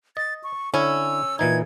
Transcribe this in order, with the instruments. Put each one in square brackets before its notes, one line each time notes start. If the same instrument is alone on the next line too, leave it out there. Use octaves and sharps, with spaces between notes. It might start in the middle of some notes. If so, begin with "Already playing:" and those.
[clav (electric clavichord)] D#5 [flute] A6
[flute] C#6
[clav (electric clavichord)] D3 E4 G#5 [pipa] C#4 [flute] E6
[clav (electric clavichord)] A#2 E3 D#4 [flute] G#6